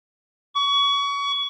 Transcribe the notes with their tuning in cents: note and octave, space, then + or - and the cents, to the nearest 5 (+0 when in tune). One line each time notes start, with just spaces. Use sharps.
C#6 +30